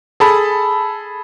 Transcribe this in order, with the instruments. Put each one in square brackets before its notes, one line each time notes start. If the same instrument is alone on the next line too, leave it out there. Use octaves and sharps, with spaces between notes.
[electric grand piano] G#4 A4 A5 B5